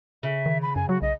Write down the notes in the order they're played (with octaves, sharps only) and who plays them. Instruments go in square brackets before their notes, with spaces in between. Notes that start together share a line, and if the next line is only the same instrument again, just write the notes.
[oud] C#3 [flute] E5
[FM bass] D#3
[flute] B5
[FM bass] F#2 [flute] G#5
[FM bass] F#3 [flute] F#4
[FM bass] B1 [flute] D#5